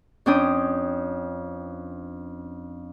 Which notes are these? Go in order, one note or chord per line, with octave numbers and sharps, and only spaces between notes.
F2 C#4 D4 G5 D#6 G6